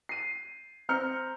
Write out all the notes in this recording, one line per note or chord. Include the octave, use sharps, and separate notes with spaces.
C7 D#7
C4 A#5 F6 G6 C#7